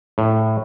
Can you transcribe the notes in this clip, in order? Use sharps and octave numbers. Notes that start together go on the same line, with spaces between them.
A2